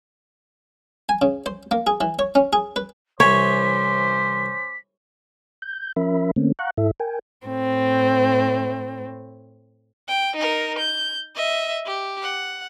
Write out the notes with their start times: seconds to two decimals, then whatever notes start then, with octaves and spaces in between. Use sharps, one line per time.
1.09 G#5
1.22 C#3
1.46 C5
1.71 A#3
1.87 G#4
2.01 E3
2.19 C#5
2.35 C#4
2.53 G#4
2.76 B4
3.20 C2 E3 C#4 E4 C5 C#5 D6 B6
5.62 G6
5.96 F3 C#4 A#4 E5 B5
6.36 D3 A3 A#3 C4 C#4
6.59 F5 F#5 A#5 C#6 F#6
6.77 G#2 E4 A4 E5
7.00 A#4 G5 G#5
7.46 A2 C4
10.08 G5
10.36 D#4 A#4
10.78 G6
11.35 D#5 E5
11.86 G4
12.22 F#5